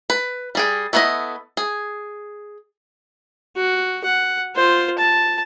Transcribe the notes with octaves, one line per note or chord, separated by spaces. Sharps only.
B4
G3 G#4 G5
A3 B3 E4 B4 D#5
G#4
F#4
F#5
F4 C5
A5